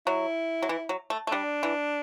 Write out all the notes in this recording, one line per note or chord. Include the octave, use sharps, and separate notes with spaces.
F#3 E4
F#3
E3
F#3
A3
A3
G3 D4
E3